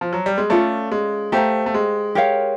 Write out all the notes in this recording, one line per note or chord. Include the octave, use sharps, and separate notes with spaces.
F3
F#3
G3
G#3
A3 C#4 F4 A4 D5
G#3
A3 G4 C5 F5 A#5
A3
G#3
G4 A#4 C#5 F5